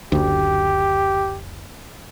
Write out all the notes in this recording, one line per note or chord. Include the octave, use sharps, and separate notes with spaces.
F#1 D2 G4